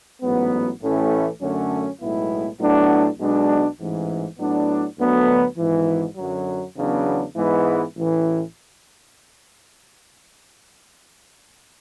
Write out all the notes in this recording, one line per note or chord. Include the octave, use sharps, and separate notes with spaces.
A1 G#2 F#3 B3
A1 A2 E3 A3 C#4
F#2 D3 A3 C#4
B1 A2 G#3 B3 E4
A2 F#3 B3 D4
B1 B2 G#3 D4
A1 G#2 E3
A2 F#3 B3 D4
D2 D3 F#3 B3
G#1 G#2 E3
F#2 D3 F#3
E2 C#3 F#3 B3 D4
G#2 E3 G#3 B3 E4
A1 A2 E3